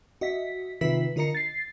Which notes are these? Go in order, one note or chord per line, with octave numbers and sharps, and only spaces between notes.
F#4 D#5 E5 B6
C3 D#3 F4 B4 E5 B6
D3 F4 A#4 D#5 A#5 C#7
A6 C7